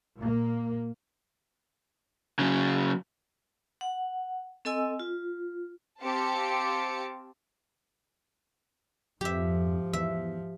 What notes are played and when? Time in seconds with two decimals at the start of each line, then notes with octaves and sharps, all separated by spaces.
0.19 A#2 A#3
2.39 C#3 F#3
3.81 F#5
4.65 C4 A4 D#5 G#5 E6
4.99 F4
6.01 C4 G4 F5 A5 D6 C#7
9.21 F2 G#2 F3 G4 E5
9.93 E2 E5